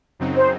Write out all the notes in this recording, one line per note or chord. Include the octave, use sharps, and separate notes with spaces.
F#2 C#3 F#3 C4 D#4
C5